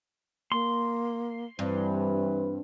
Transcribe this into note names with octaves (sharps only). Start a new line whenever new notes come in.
A#3 C6
G2 E3 C4 B4